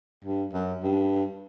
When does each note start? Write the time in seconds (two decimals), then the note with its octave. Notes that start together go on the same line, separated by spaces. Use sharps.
0.25 G2
0.53 F#2
0.82 G2